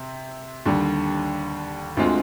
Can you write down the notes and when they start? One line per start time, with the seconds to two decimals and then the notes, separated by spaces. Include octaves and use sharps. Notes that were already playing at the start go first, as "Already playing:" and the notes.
Already playing: C3 C4
0.66 D#2 D3 G3
1.97 D2 D3 G#3 C4 F4